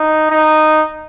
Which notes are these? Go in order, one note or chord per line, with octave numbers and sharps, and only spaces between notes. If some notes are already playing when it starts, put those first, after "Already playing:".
Already playing: D#4
D#4